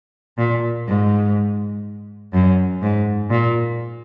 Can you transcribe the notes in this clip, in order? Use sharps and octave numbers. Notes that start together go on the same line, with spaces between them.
A#2
G#2
F#2
G#2
A#2